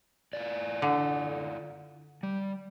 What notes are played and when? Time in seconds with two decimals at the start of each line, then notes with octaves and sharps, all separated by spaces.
0.33 E4 F4 D5
0.82 D3
2.23 G3